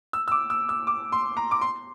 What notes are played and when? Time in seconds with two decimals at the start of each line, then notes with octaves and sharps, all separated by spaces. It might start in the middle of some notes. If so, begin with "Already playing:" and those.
0.13 E6
0.28 E6
0.32 D6
0.50 E6
0.69 E6
0.87 D6
1.12 C6
1.37 A#5
1.51 D6
1.61 C6